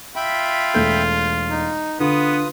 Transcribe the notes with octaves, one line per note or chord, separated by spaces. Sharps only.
F4 E5 G5 B5
E1 A3 G6
D#4
D3 B3 F4 B4 D#6